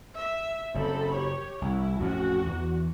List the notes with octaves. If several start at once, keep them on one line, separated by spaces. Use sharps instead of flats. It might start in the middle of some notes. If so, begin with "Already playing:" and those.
E5
F#1 F#2 C4 A4 B5
G4 C#5
C2 E4
A1 F2 C#4 F#4
E2 E3